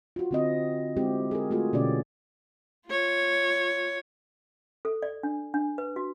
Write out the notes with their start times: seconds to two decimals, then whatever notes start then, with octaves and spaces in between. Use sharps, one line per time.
0.16 F4 F#4
0.31 D3 C4 D#5
0.97 G#3 C4 E4 F#4 G4
1.31 G#4 A#4
1.51 A3 F4 F#4 G#4
1.73 B2 D3 B3 C#4 G4 D5
2.87 F4 C#5
4.85 A4
5.02 D5
5.23 D4
5.54 D4
5.78 B4
5.96 F#4